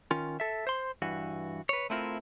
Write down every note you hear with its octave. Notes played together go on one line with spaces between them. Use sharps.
D#3 C#4 F4
A4 E5
C5 C6
G2 E3 F#4
B4 C#5
A3 C4 E4 F4 A#4